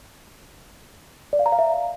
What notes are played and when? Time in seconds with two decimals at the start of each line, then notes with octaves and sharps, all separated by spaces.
1.33 D5
1.39 F5
1.46 A#5
1.52 F5
1.59 E5